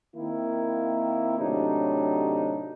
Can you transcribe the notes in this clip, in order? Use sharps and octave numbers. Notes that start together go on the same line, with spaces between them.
D#3 A#3 C4 E4
A2 C3 F#3 D4 D#4